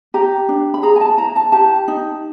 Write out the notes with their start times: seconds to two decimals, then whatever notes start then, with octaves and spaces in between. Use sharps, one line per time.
0.14 G4 A#5
0.49 D4
0.74 B5
0.83 G#4 A#5
0.96 G#5
1.01 A5
1.18 E4 A#5
1.36 A5
1.52 G4 A5
1.88 D#4